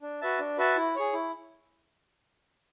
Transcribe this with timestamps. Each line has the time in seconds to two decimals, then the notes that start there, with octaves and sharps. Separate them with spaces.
0.02 D4
0.21 F#4 B4 E5 A5
0.39 D4
0.58 F#4 B4 E5 A5
0.76 E4
0.96 G#4 C#5
1.13 E4